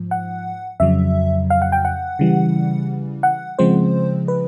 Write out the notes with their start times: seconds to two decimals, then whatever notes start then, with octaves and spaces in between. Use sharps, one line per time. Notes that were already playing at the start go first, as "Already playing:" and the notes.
Already playing: G#2 F3
0.11 F#5
0.80 F2 C#3 F#3 E5
1.50 F5
1.62 F#5
1.72 G5
1.85 F#5
2.19 C#3 E3 G3
3.23 F#5
3.59 C#3 F3 G#3 C4 C5
4.28 B4